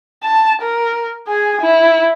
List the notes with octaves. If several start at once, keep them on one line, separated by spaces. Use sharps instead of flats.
A5
A#4
G#4 G#5
E4